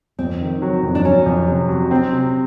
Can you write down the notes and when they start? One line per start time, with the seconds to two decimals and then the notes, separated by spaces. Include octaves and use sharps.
0.19 F2 C4
0.41 D#3
0.62 F#3
0.83 F2
0.95 D4
1.04 F#3 C#4
1.26 F2
1.48 C3
1.69 F#3
1.91 C4
2.13 C3